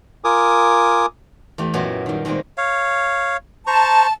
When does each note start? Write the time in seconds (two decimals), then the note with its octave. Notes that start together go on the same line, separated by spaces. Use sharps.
0.24 F4 A#4 G#5 D6 D#6
1.58 E2 A3 G4
1.74 F#2 A#2 F#3 B3 E4 D#5
2.06 D#3 G3
2.25 D#3 G3 G#3 A#3 C4
2.58 C#5 F5
3.67 C5 A5 A#5 C#6